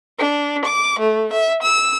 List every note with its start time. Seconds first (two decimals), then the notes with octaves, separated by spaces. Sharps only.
0.18 D4
0.64 D6
0.99 A3
1.32 E5
1.62 E6